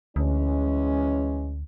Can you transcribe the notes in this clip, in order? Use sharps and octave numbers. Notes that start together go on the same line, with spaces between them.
D2 E3 G#3 C#4